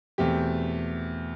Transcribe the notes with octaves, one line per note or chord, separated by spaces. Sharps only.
E2 B2 A3 C4 G4